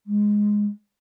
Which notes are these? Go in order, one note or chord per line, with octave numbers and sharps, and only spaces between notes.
G#3